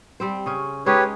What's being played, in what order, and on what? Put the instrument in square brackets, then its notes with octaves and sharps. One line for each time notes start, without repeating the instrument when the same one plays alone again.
[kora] G3 C4 C5
C#3 C#4
[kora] G#3 C#4 D#4 [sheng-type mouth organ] G4 B4 C#5